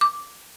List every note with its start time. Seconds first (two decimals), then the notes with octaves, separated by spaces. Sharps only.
0.01 D6